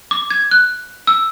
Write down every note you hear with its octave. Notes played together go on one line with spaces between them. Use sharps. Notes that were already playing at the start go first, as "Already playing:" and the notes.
D6
G#6
F#6
E6